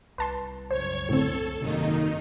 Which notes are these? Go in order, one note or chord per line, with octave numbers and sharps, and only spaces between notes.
C2 B4 A5 C6
C#2 F#2 C5 C#5 G#6
A2 D3 C4 A4
G#1 F#2 C3 D#3 A#3 D#4